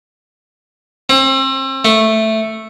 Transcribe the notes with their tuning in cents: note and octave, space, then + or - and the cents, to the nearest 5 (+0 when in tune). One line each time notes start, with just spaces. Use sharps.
C4 +35
A3 +0